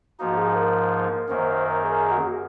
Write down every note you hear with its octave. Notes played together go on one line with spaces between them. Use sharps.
G#2 F3 A#3 D#4 F#4
G#4
A#4
F#2 D#3 A#3 C5
C5
A#4
G#4
F#4
G#4
F#4